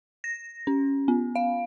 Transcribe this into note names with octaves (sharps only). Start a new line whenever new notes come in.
A#6
C#4
B3
F5